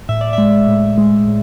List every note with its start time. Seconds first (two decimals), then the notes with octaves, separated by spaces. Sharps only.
0.09 A2 E5
0.21 D5
0.33 G#3 E5
0.68 A2
0.98 G#3
1.27 A2